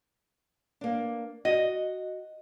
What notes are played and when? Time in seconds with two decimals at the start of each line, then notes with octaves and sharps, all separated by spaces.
0.81 A#3 D4
1.45 F#4 D#5